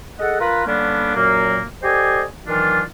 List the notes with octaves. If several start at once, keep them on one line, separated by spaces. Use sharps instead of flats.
G#4 A4 D#5 F#5
F4 A#4 B4
D3 G3 A#3 B3 C#4 D4
F#2 A#2 F#3 A#3
G4 A4 C5 D5 D#5 G#5
D#3 E3 F#3 D4 F4